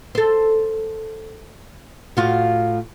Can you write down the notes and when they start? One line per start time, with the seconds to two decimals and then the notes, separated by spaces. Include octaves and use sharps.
0.15 A4 C5
2.17 A2 F4 F#4